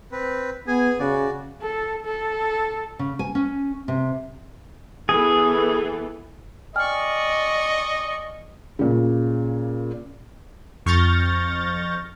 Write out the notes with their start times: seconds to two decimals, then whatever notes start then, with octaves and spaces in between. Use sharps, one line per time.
0.12 C4 B4
0.67 B3 G#4 G#5
1.00 C#3 F#4 D5
1.62 A4
2.06 A4
2.99 C#3
3.19 G#5
3.35 C#4
3.88 C3
5.09 E3 B3 G#4 A4
6.76 D5 D#5 G5 G#5 C#6 F6
8.79 A#2 C#3
10.86 F2 C#6 F6 G6 A6 A#6